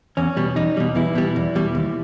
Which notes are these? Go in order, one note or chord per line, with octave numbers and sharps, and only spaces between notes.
E2 C#4
B2 G3
E2 D#4
B2 G3
E2 E3 E4
B2 G3
E2
B2 G3
D#2